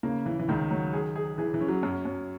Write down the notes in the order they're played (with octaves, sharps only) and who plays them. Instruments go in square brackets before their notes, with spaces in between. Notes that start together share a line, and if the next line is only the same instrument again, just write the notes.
[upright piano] C#3 [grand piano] A#3
[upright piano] C#3 [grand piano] E3
[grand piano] E3
[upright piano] C#2 [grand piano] D#3
[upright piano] F#3
G#4
G#4
[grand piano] E3 [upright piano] G#4
[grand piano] E3
[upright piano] C#4
[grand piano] F#3
[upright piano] F#2
F#2